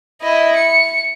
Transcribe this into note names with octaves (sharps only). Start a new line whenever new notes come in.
E4 D#5
C#7